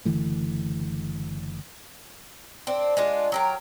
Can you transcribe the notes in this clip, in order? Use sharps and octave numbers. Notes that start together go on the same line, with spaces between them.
F#1 D3 E3 A3
C4 D4
G#3 D4 F4
F#3 G4 A#4